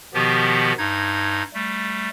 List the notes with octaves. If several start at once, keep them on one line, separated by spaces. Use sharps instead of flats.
B2 D#3 F3 B3 G4
G2 D#4 G#6
G3 A3